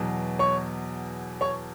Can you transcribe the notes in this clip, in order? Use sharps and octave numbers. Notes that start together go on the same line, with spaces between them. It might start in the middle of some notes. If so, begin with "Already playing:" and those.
Already playing: E2 B2 F#3
C#5 C#6
C#5 C#6